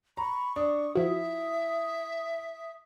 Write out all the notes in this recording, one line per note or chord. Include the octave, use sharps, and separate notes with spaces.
A#5 B5 C#6
D4 D#6
F3 E4 F#4 E5